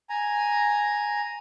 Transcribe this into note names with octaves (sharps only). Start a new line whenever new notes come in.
G#5 A#5